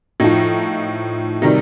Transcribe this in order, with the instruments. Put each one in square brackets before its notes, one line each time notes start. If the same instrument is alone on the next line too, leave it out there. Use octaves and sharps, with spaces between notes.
[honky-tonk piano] A2 F3 D#4
C3 D#3 G3 D#4